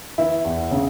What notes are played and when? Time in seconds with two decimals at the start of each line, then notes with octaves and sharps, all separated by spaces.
0.18 E3 E4
0.45 E2
0.71 C#3